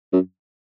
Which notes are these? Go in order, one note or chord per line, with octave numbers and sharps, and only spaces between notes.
F#2